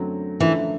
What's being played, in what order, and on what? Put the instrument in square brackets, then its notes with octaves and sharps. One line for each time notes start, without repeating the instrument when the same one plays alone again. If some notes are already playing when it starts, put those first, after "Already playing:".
Already playing: [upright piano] F#2 D3 F#3 A3 C4
[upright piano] F#2 D3 F3 A3 [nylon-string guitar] E3